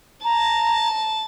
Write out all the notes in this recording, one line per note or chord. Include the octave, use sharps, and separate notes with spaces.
A5 A#5